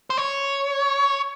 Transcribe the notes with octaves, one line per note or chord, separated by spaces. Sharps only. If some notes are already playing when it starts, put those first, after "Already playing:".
C5
C#5